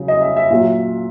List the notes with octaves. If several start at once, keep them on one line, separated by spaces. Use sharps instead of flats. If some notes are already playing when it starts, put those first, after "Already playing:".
Already playing: C#3 F#3
D#5
E5
E5
A#2 F#3 E5